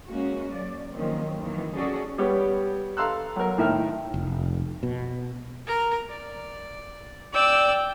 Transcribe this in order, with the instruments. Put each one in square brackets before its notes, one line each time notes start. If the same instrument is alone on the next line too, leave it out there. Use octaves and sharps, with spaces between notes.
[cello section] G#3 A#3 C#4 F#4
F#3 D5
D#3 F3 F#3 A#3 C4 C#4
F2 D#3 E3 F#3 A#3
C#4 F#4 G#4 A4 D5
[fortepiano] G3 B3 G4 C#5
A4 F5 A#5 C6 E6 F#6
F#3 A#4
A2 D#3 E5 G5 F6
[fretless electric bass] F1
B2
[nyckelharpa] A#4 A#5
D5
[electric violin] D5 E6 [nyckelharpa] G5